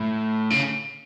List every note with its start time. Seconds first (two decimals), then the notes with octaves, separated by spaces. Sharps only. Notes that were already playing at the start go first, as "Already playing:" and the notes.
Already playing: A2
0.50 C#3